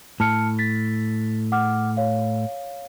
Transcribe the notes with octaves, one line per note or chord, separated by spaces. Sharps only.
A2 A5 F6 C#7
A6 B6
F#5 D6 F6
C#5 F5